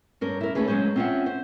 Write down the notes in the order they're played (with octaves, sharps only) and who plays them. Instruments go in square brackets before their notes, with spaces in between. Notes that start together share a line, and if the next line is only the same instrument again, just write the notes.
[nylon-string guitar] G2 C#4 A#4
E4 A#4
A3 C#4 F#4 G#4 B4
F#3 G#3 C#4 G#4 C5
C4 C#4 F4 D5 E5 F#5
C5